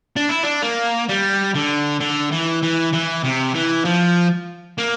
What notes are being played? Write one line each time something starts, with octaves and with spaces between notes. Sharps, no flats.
D4
E4
D4
A#3
G3
D3
D3
E3
E3
E3
C3
E3
F3
A#3